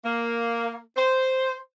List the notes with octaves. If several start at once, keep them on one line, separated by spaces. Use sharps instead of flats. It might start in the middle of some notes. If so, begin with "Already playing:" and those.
A#3
C5